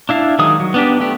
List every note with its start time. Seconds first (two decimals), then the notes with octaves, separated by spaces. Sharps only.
0.09 D4 E4 F5 A5
0.39 D#3 F#3 G#3 D#6
0.60 F#3
0.74 B3 D4 G4
1.00 A3 B3 G4